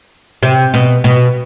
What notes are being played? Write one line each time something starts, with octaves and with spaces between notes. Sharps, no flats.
C3
B2
B2